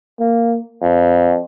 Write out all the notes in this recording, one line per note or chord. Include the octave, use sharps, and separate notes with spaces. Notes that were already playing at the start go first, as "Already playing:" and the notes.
A#3
F2